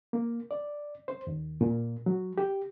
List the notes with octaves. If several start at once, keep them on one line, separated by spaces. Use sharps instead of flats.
A#3
D5
C5
D#2
A#2
F#3
G4